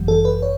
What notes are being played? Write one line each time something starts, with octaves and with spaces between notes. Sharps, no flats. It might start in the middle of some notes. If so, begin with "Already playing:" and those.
Already playing: G1 F#2 E3 G3
A4
B4
C#5